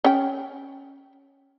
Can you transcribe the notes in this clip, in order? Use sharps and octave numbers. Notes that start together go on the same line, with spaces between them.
C#4 G5